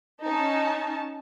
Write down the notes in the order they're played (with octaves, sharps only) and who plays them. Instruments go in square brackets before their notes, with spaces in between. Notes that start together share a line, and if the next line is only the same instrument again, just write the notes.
[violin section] C#4 D#4 A5